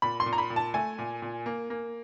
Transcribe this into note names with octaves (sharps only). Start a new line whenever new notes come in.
A#2 B5
C6
A#2
A#5
B5
A#2
A5
A3 G#5
A#2
A#2
A#3
A#3